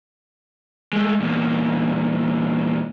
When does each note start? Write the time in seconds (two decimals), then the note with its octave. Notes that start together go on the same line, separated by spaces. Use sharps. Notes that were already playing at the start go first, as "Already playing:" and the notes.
0.93 G#3 A3
1.20 E2 A#2